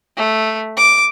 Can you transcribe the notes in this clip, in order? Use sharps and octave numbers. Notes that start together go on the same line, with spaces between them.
A3
D6